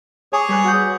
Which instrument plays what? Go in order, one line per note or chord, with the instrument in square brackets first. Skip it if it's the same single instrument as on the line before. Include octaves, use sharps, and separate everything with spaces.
[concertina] G#4 C#5 [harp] G#5 D6
[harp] G3 B4 F#6
F#4 F#5 G6